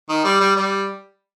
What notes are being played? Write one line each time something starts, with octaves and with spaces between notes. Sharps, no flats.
D#3
G3
G3
G3